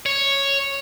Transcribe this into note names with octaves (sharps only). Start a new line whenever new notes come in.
C#5